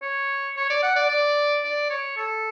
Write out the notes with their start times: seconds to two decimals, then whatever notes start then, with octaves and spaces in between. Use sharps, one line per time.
0.02 C#5
0.57 C#5
0.70 D5
0.83 F#5
0.96 D5
1.09 D5
1.64 D5
1.90 C#5
2.17 A4